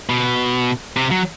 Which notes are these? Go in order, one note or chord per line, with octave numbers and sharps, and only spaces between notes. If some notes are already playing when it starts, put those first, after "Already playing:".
B2
C3
F#3